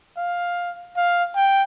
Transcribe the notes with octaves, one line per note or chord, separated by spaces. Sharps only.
F5
F5
G5